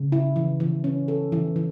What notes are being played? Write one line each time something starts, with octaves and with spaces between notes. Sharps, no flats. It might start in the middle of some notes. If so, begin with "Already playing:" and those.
Already playing: C#3
E4
E3
E3
C#4
A4
E3
E3